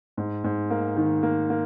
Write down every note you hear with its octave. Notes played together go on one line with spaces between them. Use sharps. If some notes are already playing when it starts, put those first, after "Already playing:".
G#2
G#2
A#3
D#3
A#3
A#3